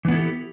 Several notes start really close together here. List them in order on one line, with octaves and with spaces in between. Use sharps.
E3 B3 E4 A4 G4